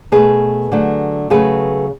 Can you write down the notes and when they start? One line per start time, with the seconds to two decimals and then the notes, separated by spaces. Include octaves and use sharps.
0.12 B2 A3 G#4 B4
0.72 D3 F#3 A3
1.30 C#3 F#3 A3 G#4 B4